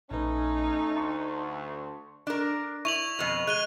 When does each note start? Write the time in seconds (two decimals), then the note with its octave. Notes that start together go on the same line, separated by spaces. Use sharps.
0.11 A#1 A3 C#4 D#4 B4
0.96 D2 A5 C6 C#6
2.27 D4 A#4
2.85 E4 C#6 F7 F#7
3.19 F2 B2
3.47 G#3 F#6 D#7 G7